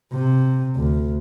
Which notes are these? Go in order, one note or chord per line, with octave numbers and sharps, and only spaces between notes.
C3
D2